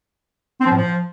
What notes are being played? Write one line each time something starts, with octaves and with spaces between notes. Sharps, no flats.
C4
F3
A2
F3